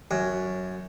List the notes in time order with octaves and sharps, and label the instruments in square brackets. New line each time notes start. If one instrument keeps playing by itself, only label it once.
[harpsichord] F#2